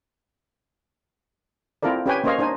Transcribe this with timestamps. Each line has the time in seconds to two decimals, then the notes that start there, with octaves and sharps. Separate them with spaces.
1.83 C4 E4 F4 A4 A#4 D5
2.06 C#4 G4 B4 C#5 G5 G#5
2.24 A#3 C#4 C5 C#5 D#5 F5
2.39 D4 D#4 C5 G#5